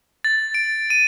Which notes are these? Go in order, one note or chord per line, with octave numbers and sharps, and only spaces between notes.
A6
D7
D#7